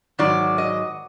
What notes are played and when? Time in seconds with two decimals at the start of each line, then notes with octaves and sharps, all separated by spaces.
0.19 G#2 D#3 F#3 D5
0.58 D#5